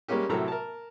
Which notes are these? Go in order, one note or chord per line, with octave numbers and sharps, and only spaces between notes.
G3 G#3 A#3 C#4 G4
A2 C3 F#3 A4 A#4 A#5
A#4 A5